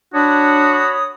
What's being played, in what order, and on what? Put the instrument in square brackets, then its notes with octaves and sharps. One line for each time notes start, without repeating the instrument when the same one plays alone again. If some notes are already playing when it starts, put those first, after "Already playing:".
[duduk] D4 [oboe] F#4 [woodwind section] C#5 B5 D#6